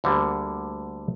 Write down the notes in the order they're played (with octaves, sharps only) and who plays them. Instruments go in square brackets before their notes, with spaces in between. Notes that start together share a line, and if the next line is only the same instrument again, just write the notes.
[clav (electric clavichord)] D2 D3 G3 A#3